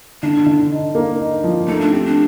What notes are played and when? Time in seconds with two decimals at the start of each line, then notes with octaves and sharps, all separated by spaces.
0.22 D3 D4
0.46 D3
0.71 D#4
0.95 A#3
1.19 D#4
1.44 F3
1.68 A3 D#4
1.81 D4
1.92 C4 G4
2.06 D4